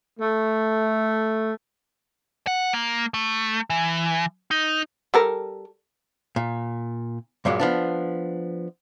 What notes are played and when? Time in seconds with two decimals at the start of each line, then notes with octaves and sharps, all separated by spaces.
0.20 A3
2.47 F#5
2.73 A#3
3.14 A3
3.70 E3
4.51 D#4
5.14 G3 A4 A#4
6.36 A#2
7.45 G2 A#2 F#3 G#3
7.60 F3 B3 D4